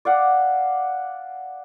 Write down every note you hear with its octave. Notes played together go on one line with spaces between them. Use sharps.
D5 F5 F#5